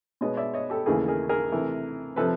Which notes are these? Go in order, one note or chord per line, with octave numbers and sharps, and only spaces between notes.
B2 G#3 B3 C#5 D#5
D5 E5
C#5 D#5
G4 A4
D#2 C#3 E3 A3 G#4 A#4
G#4 A#4
G#4 A#4
C3 E3 A3
C3 F3 A4 B4